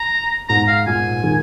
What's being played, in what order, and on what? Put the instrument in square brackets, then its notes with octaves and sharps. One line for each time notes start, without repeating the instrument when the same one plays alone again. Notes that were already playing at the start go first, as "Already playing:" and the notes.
Already playing: [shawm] A#5
[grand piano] G#2 [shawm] A#5
[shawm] F5
[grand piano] A#2 [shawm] G#5
[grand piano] D#3 G#3